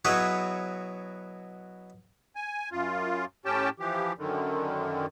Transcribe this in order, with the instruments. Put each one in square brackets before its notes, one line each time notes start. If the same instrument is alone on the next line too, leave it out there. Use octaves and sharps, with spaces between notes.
[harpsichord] B2 F#3 E4 G#4 B4 C#5
[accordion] G#5
F#2 F4
A2 C#4 G4 G5 A5
E3 F3 G4
F#2 D3 D#3